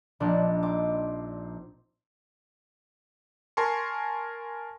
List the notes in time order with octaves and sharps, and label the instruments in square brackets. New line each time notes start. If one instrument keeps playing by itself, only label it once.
[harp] A#1 D4 F#6 [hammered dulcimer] D#4
[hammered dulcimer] C4 D#4 [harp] D6
[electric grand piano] A#4 G#5 A5 C6 C#6